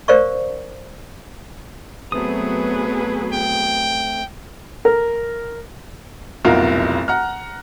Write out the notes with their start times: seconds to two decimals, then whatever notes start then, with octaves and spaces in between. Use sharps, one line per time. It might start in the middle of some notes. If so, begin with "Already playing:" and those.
0.08 A#4 C5 D5 F5 C#6
2.12 F#3 A3 B3 C4 G#4 B4 D#6
3.34 G5
4.85 A#4
6.44 F1 B1 A2 F4 A#4 F#5
7.08 F#5 A#5 F6